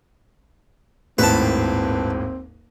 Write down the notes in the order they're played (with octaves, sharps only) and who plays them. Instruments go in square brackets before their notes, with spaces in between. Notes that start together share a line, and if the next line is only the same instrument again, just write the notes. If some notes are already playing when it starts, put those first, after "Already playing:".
[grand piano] D#1 G#1 A2 [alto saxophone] C4 [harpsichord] B4 A5